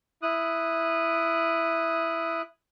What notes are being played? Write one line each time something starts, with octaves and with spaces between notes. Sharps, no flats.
E4 D#6 F#6